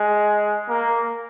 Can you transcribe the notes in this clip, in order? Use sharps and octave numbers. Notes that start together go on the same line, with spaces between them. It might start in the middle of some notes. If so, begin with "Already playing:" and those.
Already playing: G#3
A#3